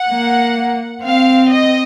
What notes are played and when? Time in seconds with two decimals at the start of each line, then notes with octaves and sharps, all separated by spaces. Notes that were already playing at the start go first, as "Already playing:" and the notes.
Already playing: F#5
0.10 A#3
1.04 C4 F5
1.51 D#5